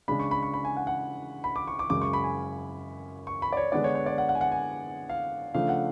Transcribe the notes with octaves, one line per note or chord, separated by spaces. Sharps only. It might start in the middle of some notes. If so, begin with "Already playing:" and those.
C#3 G#3 D4 B5
C#6
B5
C#6
B5
G#5
F#5
F#5
B5
D6
C#6
D6
F#2 C#3 G#3 D6
C#6
B5
G#5
C#6
B5
D5
C#5
D3 G#3 B3 D4 D5
C#5
C#5
D5
F#5
F#5
G#5
F#5
G#5
F5
C#3 F3 A3 D4 F5
F#5